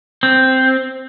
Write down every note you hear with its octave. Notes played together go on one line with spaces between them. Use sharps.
C4